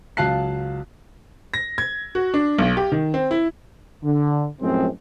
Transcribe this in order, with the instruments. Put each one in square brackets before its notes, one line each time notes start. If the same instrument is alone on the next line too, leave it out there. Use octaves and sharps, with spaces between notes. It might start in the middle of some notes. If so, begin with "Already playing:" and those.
[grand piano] C#2 F#3 F5 A5 F#6 C7
[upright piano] A#6
G#6
F#4
D4
B1
G4
D#3
C4
E4
[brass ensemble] D3
F#2 A2 F3 G#3 C4